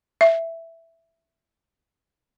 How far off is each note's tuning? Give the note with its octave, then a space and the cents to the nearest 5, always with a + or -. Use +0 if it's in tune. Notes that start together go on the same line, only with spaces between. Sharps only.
E5 +5